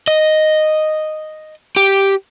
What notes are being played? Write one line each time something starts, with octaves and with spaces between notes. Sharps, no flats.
D#5
G4